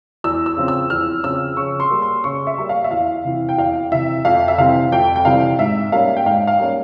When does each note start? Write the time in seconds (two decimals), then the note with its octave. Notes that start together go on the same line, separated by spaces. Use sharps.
0.24 E2 E6
0.46 E6
0.57 C#3 F3 C4
0.68 E6
0.90 E2 F6
1.23 C#3 F3 C4 E6
1.57 C#3 C#6
1.80 C6
1.91 G3 A#3
2.02 C6
2.24 C#3 C#6
2.47 E5
2.58 G3 A#3
2.69 F5
2.84 E5
2.91 E2 F5
3.25 C3 E3
3.49 G5
3.58 E2 F5
3.92 C3 E3 E5
4.25 F2 F5
4.48 E5
4.58 C3 E3 G3 C4 F5
4.92 F2 G5
5.16 G5
5.25 C3 E3 G3 C4 F5
5.59 G#2 E5
5.92 G3 A#3 C#4 F5
6.17 G5
6.26 G#2 F5
6.47 F5
6.59 G3 A#3 C#4